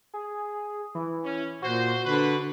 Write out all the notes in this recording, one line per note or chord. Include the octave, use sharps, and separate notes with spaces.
G#4
E3
C#4
A#2 F#4 C5
D3 B4